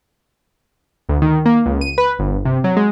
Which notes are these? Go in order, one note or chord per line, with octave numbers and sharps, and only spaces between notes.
D2
D#3
A#3
C#2
D#7
B4
G1
C3
F#3
G#3